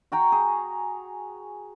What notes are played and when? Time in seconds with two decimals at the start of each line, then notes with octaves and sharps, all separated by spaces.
0.12 F#4 G5 A#5 C#6
0.32 G#4